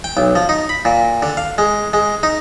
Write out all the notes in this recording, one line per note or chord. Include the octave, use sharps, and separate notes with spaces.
G5
B1
F3
D#4
B5
A#2
D3
F5
G#3
G#3
D#4